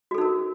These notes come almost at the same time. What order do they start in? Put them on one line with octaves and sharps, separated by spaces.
F#4 A4 D#4 A#4